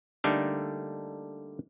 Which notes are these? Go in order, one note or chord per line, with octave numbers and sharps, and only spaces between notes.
D3 G3 A3 A#3 D4 D#4